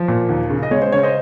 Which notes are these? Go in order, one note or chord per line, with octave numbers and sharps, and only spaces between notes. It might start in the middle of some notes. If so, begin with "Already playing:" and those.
Already playing: F3
A#2
D#2
C#3
D#5
G#3 C#5
C5
C#3 C#5
C5 D#5